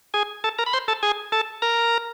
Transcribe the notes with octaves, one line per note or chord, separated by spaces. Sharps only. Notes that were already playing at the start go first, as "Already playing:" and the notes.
G#4 G#5
A4 A5
A#4 A#5
B5
C5 C6
A4 A5
G#4 G#5
A4 A5
A#4 A#5